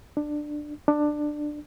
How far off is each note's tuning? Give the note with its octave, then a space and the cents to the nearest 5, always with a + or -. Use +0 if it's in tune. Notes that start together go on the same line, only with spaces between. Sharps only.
D4 +15
D4 +15